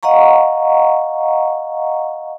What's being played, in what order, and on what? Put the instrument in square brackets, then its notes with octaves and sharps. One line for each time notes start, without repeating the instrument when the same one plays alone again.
[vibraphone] D#5 F5 F#5 A#5 C#6